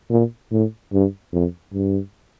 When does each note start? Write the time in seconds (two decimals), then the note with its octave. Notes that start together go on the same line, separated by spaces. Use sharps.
0.10 A#2
0.51 A2
0.92 G2
1.32 F2
1.73 G2